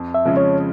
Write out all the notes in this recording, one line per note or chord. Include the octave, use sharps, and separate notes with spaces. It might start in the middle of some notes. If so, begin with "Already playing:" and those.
Already playing: F2
E5
C#3 F3 G#3 C#4
C#5